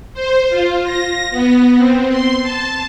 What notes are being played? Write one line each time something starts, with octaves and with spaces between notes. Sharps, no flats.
C5
F4
A#6
B3
C4
C6
A5